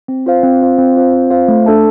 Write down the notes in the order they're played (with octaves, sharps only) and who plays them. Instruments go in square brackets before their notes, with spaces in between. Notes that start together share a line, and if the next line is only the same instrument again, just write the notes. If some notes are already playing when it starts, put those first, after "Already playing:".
[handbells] C4
F4 C5 F5
C4
F4 C5 F5
C4
F4 C5 F5
C4
F4 C5 F5
A3
D4 A4 E5 A5